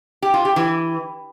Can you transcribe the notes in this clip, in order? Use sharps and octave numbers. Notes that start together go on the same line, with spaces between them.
G4
F4
G4
E3